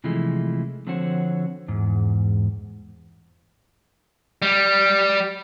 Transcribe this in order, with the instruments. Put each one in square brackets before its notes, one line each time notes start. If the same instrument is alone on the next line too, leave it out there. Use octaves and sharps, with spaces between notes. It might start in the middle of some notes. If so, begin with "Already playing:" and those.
[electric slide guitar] C3 E3 F3 G#3 A3
D3 F3 C4 F#4 C5 C#5
E2 G#2
[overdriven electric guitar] G3